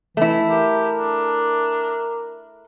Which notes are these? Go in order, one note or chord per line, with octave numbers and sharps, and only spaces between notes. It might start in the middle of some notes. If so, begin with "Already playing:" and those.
E3 A3 E4
G4 A#4
D4